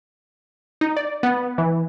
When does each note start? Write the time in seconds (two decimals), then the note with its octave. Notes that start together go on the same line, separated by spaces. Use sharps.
0.81 D#4
0.96 D5
1.23 B3
1.58 E3